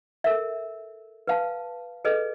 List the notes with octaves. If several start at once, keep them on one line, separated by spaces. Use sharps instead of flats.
A4 A#4 E5
B4 F5 A5
G#4 A4 B4 D#5